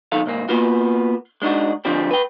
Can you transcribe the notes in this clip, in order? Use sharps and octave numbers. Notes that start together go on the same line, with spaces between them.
B1 D#3 A4 F5
C2 G#2 A#3
A#3 B3 F4 F#4
G#3 D4 D#4 F#4
D3 F3 G3 G#3 C4
B4 G5